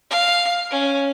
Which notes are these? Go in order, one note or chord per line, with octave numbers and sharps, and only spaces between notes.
F5
C#4